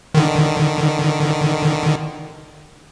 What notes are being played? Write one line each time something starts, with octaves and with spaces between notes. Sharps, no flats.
D3 D#3